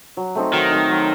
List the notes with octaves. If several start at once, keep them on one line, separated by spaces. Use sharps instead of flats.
F#3
A3 C4 D#4
D#3 F#3
A3 C4 D#4
F#3